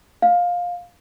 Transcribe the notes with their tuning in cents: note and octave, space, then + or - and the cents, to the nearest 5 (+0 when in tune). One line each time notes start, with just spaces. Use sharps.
F5 +15